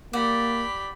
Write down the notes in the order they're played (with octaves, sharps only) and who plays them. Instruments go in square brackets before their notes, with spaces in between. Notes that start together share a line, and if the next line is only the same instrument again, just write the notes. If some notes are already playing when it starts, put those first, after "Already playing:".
[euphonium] A#3 [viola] G4 B5 [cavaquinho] D5 F#5